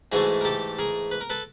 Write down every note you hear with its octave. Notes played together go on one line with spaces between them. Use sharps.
G#2 E3 A3 F#4 G#4
A#4
G4 A4
G#4 A#4
B4
A#4
A4 B4